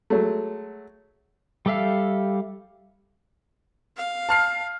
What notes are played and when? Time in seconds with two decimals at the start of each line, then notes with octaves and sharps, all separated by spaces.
0.10 F#3 G#3 A3
1.66 G3 G4 A4 E5 F5
3.96 F5
4.29 A5 F6 C7